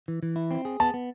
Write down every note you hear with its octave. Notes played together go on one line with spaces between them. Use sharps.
E3
E3
E4
C4
G#4
B3 A5
B3